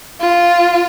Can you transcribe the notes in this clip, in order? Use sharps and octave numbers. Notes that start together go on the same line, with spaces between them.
F4